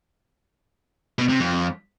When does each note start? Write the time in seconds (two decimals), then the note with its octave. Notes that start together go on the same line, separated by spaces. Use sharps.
1.18 B2
1.29 C3
1.40 F2